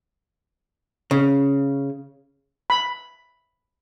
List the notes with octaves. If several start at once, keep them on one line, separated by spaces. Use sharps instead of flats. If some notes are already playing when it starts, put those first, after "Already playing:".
C#3
B5